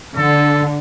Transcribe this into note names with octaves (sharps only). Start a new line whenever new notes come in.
D3 A4